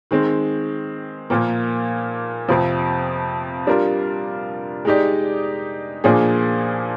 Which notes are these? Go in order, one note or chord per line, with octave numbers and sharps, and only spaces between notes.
D#3 G#3 C4
A#2 F3 A#3
F2 C3 F3
G3 D4 F4 A#4
G#3 D#4 G4 D5
A#2 F3 A#3 D4 G#4